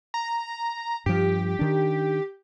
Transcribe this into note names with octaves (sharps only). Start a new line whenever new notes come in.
A#5
G2 F3 G4
D#3 D4